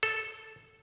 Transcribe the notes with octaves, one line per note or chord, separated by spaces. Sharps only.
A4